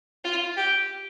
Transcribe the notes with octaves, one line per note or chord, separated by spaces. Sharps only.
F4
G4